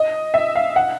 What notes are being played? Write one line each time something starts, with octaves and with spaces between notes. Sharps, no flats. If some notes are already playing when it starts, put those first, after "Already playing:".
Already playing: D#5
E5
F5
F#5